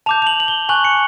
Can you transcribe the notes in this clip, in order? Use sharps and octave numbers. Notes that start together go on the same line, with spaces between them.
A5 D6 G6 F7
F7
F#7
F#7
G7
G#5 C#6 F#6 F#7
C#7